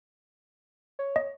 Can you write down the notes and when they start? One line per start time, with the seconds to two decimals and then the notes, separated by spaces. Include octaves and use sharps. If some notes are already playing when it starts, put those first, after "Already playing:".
0.99 C#5
1.16 D#5